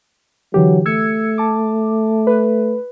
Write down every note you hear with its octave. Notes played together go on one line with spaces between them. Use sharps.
D3 E3 F#3 G4
A3 E6 G#6 C#7
A5 D6
B4